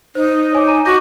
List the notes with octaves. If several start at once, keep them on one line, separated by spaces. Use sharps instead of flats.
D#4 C5
C#5 G#5 D6
A#5 D#7
F#4 D6 G6 A#6